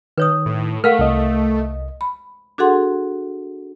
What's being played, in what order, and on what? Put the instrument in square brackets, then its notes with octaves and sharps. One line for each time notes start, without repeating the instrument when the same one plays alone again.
[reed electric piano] D#3 [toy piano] B4 C#5 D#6
[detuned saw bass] A2
[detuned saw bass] A3 [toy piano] A#4 F5 F#5 [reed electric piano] F6
[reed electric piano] C2 D#5
[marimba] B5
D4 F#4 G#4 A4 F#5 C6